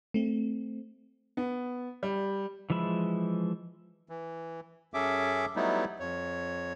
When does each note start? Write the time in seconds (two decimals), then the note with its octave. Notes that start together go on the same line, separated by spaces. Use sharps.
0.14 A3 C4
1.37 B3
2.03 G3
2.70 E3 F3 G#3 E5 B5
4.09 E3
4.94 F#2 C#4 G#4 A4 E5 D6
5.56 F#3 G3 A3 B3 D#4 E4
6.00 F2 C#5